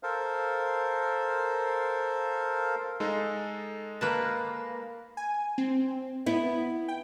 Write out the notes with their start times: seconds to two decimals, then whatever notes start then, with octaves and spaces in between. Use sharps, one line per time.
0.03 A4 A#4 C5 F5
3.00 G#3 D#4 A4
4.01 A#3 B4 A5
5.17 G#5
5.58 C4
6.26 B3 E4
6.88 G5